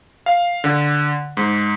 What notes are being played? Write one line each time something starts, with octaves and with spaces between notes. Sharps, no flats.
F5
D3
G#2